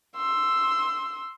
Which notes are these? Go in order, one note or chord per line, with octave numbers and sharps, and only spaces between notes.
C6 E6